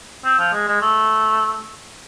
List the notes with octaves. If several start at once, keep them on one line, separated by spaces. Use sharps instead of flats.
C4
F3
G#3
G#3
A3